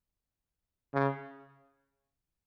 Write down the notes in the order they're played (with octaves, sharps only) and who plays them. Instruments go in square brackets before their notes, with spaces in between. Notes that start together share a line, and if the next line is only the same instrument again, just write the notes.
[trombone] C#3